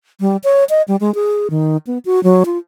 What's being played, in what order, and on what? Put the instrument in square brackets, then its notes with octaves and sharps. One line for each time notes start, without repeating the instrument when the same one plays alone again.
[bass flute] G3
C#5
D#5
G3
G#3
G#4
D#3
B3
F#4
F#3
F4